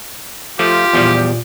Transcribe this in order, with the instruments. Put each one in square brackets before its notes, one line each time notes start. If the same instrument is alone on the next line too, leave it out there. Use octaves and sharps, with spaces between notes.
[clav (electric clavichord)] F3 A3 [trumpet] F4 [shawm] G4
[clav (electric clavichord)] E2 F3 G3 [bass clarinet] A#2